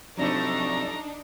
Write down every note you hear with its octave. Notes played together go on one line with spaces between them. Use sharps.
G2 C3 F3 F#3 A3 D4 D#4 A#5